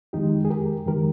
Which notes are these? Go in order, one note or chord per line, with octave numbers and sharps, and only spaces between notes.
F2 D#3 G#3 D#4 G4
G#4
G4 A#4
F2 D#3 G#3 G4 A#4